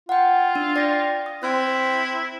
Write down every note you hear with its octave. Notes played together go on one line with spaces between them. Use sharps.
F4 F#5 G5
D4
D5 G5 A#6
D#6
C4 E4 F#6